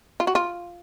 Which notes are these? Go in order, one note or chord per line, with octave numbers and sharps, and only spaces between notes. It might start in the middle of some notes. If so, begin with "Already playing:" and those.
F4
F#4
F4